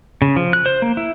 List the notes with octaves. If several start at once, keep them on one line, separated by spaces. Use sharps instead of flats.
C#3
F3
F#6
C5
A#3
E4